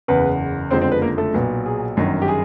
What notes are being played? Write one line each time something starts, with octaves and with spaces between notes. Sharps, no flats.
F#1 E2 C#3 B3 B4
F#1 F2 D3 F3 G#3 C4 C5
C4 C5
B3 B4
A#3 A#4
A3 A4
B1 A#2 F#3 B3
G#4
G1 F#2 D#3
G4
G#4